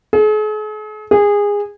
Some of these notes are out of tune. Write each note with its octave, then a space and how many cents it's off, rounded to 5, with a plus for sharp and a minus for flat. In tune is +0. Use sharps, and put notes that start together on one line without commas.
G#4 +45
G#4 -20